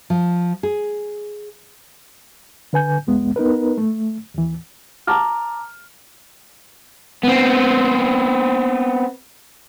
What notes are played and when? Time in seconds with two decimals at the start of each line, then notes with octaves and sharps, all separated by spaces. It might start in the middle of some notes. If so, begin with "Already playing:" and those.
0.10 F3
0.63 G#4
2.73 D3 B4 G#5 G6
3.07 C2 F2 G#3 B3
3.36 B3 D#4 A#4 B4
3.78 A3
4.34 D#2 E3
5.07 A5 A#5 D6 F6
7.24 B3 C4